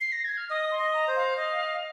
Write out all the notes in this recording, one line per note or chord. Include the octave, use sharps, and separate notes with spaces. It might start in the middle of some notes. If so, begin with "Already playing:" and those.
C7
A#6
G#6
F6
D#5 D#6
C6
D#5
A#5
C5
F5
D#5